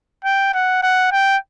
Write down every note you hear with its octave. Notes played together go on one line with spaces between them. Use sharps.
G5
F#5
F#5
G5